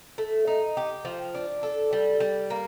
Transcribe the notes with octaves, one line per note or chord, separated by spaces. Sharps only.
A3
D#4
G4
F3
D4
A4
G3
G3
A#3